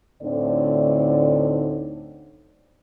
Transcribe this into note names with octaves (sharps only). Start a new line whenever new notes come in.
D2 A2 D3 C4 D#4 D5